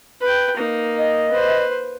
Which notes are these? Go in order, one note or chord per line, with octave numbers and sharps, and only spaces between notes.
B4 G5
A#3 D#4
D#5
B4 C5